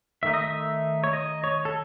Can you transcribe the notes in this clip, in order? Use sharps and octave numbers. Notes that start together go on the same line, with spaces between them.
D#3 A3 D#4 E5
D#5
E5
C#5
D#5
C#5
A4